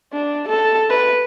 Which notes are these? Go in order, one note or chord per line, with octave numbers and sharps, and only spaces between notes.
D4
A4
B4